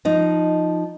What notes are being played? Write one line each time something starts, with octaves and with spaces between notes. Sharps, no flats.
F3 D#4